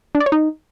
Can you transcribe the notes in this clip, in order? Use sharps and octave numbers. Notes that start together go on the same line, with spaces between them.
D4
D5
C#5
D#4